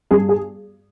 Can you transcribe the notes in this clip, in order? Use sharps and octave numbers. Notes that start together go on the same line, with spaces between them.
G2 G#4
G#4